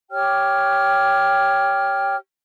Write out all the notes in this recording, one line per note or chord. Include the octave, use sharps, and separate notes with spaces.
G4 C#5 G5 F6